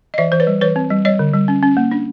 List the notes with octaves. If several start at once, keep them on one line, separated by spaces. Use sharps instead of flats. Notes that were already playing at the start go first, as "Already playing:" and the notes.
D#5
E3 D5 E5
E3 C5
B4 C#5
G3
E3 B4 C#5
C4
G3
G3 C#5 D#5
D3
G3
C#4
C#4
A#3
D4